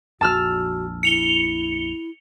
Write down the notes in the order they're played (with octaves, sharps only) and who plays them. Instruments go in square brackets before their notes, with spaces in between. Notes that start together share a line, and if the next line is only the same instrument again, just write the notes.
[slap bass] A#1 F2 [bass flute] F#4 [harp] A5 E6 F6
[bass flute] E4 [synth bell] C#7 F7 G7